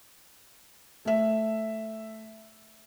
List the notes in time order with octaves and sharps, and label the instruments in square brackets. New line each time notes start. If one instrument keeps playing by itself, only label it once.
[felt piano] A3 E5